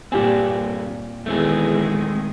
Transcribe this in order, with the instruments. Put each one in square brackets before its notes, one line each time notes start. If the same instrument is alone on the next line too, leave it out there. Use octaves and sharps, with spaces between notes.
[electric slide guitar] G2 C4 [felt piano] A#2 G4 G#5
[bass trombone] E2 [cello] D#3 G#3 [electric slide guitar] A3 C4 G#4